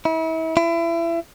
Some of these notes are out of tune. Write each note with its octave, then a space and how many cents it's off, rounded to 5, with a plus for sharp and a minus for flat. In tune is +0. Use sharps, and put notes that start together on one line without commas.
E4 -35
E4 +30